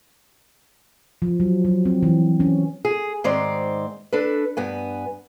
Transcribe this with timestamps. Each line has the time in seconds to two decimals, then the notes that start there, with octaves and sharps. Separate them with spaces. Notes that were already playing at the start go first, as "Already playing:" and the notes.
1.22 F3
1.40 F#3
1.65 F#3
1.85 C4
2.03 E3
2.40 C#4
2.85 G#4
3.24 G#2 D#3 G#3 C4 C5 D5
4.13 D4 A4 B4
4.57 G2 B3 G#5